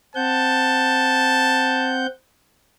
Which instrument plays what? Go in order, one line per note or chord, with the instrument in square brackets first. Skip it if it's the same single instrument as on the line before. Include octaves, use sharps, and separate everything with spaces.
[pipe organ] C4 F#5 G6 [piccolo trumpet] A5